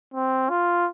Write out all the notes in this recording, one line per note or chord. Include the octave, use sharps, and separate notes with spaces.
C4
F4